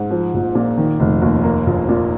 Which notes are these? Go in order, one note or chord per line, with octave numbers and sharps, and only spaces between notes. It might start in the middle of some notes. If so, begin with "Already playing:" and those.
Already playing: G#2
F3
A#1
A#2
D#3
F1
D#2
A#3
A#1
A#2